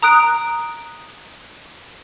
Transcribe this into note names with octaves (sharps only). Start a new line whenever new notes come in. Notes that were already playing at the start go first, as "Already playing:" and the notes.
A#5 D#6 F#6 D7